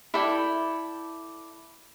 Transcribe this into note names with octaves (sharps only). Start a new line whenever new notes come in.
E4 A4 D5 G5